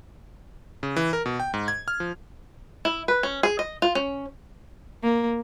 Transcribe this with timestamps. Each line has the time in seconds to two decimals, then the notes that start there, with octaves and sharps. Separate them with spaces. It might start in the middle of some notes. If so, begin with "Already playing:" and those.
0.83 C#3
0.96 E3
1.13 A#4
1.26 B2
1.40 G5
1.54 G#2
1.68 G#6
1.88 F6
2.00 F3
2.85 E4
3.08 B4
3.23 C#4
3.43 G#4
3.59 D#5
3.82 F4
3.95 C#4
5.03 A#3